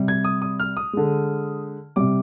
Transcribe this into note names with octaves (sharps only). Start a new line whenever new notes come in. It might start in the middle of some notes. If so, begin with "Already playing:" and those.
Already playing: C3 G3
G#6
D#6
D#6
F6
D#6
D3 G#3
C3 G3 D6